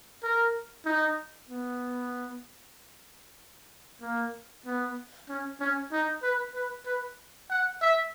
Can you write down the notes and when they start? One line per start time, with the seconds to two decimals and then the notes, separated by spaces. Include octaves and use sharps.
0.23 A#4
0.86 D#4
1.50 B3
4.02 A#3
4.66 B3
5.29 C#4
5.60 C#4
5.92 D#4
6.23 B4
6.54 B4
6.86 B4
7.50 F#5
7.82 E5